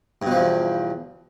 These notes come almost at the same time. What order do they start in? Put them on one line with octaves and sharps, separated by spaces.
G2 B2 F3 E2